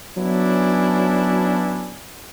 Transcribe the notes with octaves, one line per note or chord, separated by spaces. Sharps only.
F#3 B3 C#4 D4 E4